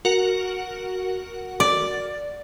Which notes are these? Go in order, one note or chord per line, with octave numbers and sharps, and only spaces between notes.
F#4 A#4 F#5
D5